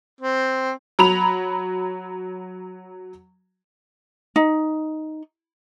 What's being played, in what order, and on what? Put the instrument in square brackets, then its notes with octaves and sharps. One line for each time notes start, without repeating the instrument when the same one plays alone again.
[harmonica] C4
[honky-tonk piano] F#3 A#5 B5 F7
[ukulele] D#4